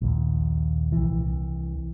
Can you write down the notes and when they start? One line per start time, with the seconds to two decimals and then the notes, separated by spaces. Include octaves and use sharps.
0.02 A#1 D#2
0.92 C2 E3